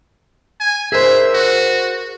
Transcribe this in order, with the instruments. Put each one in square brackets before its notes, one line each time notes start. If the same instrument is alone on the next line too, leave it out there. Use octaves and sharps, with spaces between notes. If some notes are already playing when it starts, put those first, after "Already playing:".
[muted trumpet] G#5
[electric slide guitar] G#4 A#4 C5 [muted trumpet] E5
[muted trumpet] F#4